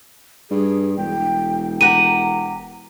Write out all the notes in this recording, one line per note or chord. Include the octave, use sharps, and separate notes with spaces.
G2 G#4
E1 G5
G4 A#4 F#5 A#5 D#7